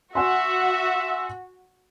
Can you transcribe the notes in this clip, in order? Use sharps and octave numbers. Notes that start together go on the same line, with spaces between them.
F#4 E5 F#5 G#5 C6